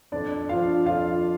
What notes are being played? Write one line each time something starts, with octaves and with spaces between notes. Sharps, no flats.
F2 D4 D5
F3 D4 F4 F5
F2 F4 F5